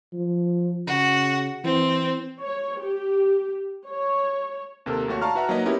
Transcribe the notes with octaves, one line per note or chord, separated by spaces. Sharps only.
F3
C#3 F#4
E3 C4
C#5
G4
C#5
D#2 C3 A4 A#4
D#2 A3 F#4 C#5
D5 F5 A5 A#5 C#6 F6
F#4 B4 E5 F#5 A5 A#5
F#3 A#3 D#4 B4 D#5
B3 C#4 E4 G4 A#4 C#5